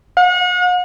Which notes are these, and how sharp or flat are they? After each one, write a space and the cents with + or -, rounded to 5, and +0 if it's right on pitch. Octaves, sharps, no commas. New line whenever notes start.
F#5 -40